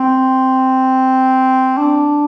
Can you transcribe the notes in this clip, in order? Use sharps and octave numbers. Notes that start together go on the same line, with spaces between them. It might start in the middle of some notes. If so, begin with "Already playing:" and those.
Already playing: C4
D4